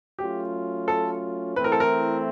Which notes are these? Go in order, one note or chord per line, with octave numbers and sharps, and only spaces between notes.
F#3 A3 C#4 F4 G4
A4
E3 A3 C4 E4 B4
A#4
A4
A#4